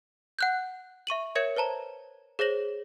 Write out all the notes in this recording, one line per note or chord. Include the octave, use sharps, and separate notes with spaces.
F#5 F#6 G6
E5 C#6 D#7 F#7
A#4 C#5 E5 G#6 C#7 E7
B4 C5 A5 A#5
G#4 C5 C#5 A#6 F#7